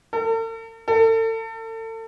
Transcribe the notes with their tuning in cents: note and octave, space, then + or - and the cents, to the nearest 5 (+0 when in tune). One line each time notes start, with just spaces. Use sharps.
A4 +45
A4 +35